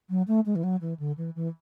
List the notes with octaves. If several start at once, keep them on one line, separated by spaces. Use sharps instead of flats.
F#3
A3
G#3
E3
F#3
E3
D3
E3
E3